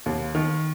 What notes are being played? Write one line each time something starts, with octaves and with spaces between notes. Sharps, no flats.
D#2
D#3